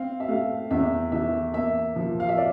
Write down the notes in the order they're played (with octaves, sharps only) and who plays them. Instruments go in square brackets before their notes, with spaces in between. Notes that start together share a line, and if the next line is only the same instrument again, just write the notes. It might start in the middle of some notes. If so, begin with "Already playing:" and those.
Already playing: [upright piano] C4 F5
E5
A3 F5
E2 E5
E3 E5
A#3 E5
F3
F5
E5
D5